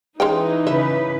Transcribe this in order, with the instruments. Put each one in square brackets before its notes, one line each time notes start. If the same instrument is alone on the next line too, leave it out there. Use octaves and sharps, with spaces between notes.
[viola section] E3 D#4 [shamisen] G#3 C#4 G5
[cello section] C#3 B4 [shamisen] D#5 E5